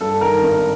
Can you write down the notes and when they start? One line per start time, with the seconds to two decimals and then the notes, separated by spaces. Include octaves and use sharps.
0.01 G2 A4
0.21 D#3 A#4
0.42 G#1